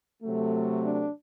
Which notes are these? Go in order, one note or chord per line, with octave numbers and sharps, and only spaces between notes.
C3 F#3 A3
D4